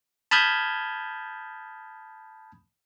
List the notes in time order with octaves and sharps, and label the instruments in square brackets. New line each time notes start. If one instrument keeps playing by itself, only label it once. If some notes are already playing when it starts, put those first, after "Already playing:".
[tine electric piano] A5 B5 D#6 F6 G6 G#6